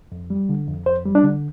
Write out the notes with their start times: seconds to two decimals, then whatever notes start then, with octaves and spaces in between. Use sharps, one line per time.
0.12 F2
0.30 G3
0.49 D3
0.68 F2
0.86 F2 C5
1.05 G3
1.15 D4
1.24 D3